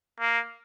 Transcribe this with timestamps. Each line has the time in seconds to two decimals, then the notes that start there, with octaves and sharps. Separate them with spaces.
0.20 A#3